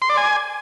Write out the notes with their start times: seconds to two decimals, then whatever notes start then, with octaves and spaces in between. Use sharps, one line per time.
0.02 C6
0.10 D5
0.17 G#5